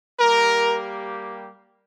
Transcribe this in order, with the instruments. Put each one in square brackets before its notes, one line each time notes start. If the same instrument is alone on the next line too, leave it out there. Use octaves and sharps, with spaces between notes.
[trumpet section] G3 A#3 G4 A#4